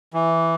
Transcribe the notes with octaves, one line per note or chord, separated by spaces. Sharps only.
E3